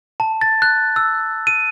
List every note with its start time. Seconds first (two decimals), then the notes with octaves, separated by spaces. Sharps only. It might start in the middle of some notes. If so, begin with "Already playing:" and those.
0.20 A5
0.41 A6
0.62 F#6
0.96 E6
1.47 D#7